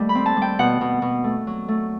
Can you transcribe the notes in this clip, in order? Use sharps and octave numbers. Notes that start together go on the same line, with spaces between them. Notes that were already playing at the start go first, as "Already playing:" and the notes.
Already playing: D#2 G3 A3
B5
C4
A5
G3
G5
B2 F#5
B2
B2
A3
F#3
A3